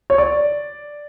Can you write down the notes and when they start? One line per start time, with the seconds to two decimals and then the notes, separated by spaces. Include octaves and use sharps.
0.10 C#5
0.18 D5